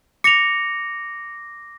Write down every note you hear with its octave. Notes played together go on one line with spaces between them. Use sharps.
D6 A#6 C#7 F7